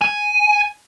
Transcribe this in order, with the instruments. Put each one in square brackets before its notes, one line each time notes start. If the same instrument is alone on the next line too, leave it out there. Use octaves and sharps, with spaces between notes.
[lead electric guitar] G#5